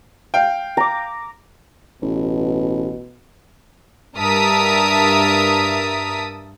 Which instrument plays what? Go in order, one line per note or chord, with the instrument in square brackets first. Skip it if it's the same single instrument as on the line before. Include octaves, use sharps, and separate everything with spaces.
[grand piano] F5 G5
[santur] A#5 D6
[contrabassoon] A1 [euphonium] B2
[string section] G2 A#4 E5 A5 D#6 B6